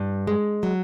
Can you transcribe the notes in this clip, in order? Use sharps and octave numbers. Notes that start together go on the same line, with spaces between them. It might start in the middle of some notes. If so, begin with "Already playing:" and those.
Already playing: G2
G#3
F#3